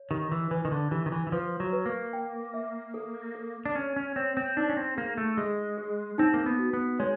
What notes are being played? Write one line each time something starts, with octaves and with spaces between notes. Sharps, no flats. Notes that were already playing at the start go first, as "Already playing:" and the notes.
Already playing: C#5
D#3 G4
E3
E3 B4
D#3
D3
E3 G4
D#3
E3
E3
F3 B4
F#3
B4
A#3
G5
E5
A4
A4
D4
C#4 C#5
C#4
C4 C#5
C4
D4 D#4
C#4
C4
A#3 G#4
A3
G#3 G#4
G#4
C4 D#4
A#3
B3
F#4
B3
G#3 C#5